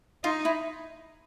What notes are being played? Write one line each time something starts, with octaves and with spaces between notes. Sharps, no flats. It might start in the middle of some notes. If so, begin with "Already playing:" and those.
D#4 F4
E4